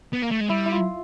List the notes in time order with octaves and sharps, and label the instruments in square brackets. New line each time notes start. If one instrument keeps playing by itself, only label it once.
[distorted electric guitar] B3
A#3
A3
G#3
[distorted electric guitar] G3 [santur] E4
[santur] E4
F4